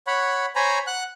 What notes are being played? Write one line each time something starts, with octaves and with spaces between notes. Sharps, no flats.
C#5 F#5 B5
C5 C#5 G#5 A#5 B5
F#5 F#6